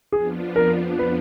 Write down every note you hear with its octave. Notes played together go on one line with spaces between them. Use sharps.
F2 F3 B3 D4 F4 G#4
A#4
B4